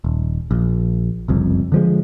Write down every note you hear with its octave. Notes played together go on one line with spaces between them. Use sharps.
D#1
A#1
F#1 C2 F2
D3 F3 G#3